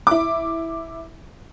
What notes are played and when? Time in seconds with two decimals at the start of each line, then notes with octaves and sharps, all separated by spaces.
0.07 E4 D6